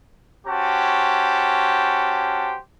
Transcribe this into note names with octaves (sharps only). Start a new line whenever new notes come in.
C#4 F#4 G4 C5 A5